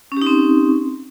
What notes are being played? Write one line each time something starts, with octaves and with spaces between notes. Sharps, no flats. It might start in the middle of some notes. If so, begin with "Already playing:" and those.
C4 C#4 D#4 G4